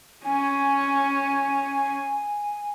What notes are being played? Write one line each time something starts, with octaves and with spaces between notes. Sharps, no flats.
C#4 G#5